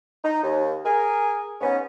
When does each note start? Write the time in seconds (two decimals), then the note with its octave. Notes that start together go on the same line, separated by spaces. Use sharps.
0.24 D#4
0.42 D#2
0.85 G#4 A#4 G#5
1.61 G#2 B3 C#4